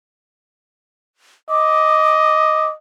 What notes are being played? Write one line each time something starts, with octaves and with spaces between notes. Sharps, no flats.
D#5 D6